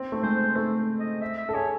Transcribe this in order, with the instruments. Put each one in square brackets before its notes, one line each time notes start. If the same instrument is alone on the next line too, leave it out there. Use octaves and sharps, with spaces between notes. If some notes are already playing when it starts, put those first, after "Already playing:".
Already playing: [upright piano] C4
A3
[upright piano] G#3 [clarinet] C5
[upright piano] A3 [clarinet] A4
[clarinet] D#5
E5
E5
[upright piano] A4
[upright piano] G#4 [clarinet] C#5